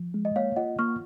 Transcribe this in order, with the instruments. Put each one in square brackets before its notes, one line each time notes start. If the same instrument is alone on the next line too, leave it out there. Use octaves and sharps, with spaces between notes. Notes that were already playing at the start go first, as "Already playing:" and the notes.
Already playing: [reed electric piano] F3
G#3
[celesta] D#5
[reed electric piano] A#3 [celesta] C#5 F5
[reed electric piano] F4 [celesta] D#5 F#5
[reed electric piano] A#3 [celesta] C#6 F6